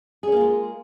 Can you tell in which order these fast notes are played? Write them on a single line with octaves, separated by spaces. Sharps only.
G#4 C#4 A#3 F4 G#3